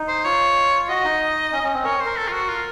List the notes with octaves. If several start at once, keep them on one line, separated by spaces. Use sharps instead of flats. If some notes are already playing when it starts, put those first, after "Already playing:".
Already playing: D#4
C5
F4 C#5
F#4 D#5
D#4
C#4
C#4
C4
A#4 C#5
C5
A#4
A4
F4
F#4
F4